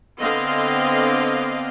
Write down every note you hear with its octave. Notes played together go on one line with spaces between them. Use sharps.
D3 B3 C4 D#5 F5